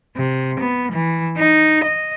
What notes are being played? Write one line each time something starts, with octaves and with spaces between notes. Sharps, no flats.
C3
B3
E3
D#4
D#5